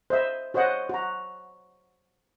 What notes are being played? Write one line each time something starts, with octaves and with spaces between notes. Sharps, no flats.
C5 D#5 E5
F#4 C5 C#5 D#5 F#5
F#4 A#5